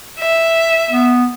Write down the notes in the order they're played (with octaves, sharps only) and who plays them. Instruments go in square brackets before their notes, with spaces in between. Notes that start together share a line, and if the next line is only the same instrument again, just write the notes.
[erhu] E5
[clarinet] B3